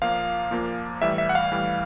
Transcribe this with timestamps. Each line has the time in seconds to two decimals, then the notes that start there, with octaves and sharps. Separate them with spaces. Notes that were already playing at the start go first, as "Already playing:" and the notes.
0.02 A#2 F3 A#3 F5
0.51 A#2 F3 A#3
1.02 A2 E3 G3 E5
1.18 E5
1.29 F#5
1.35 F5
1.51 A2 E3 G3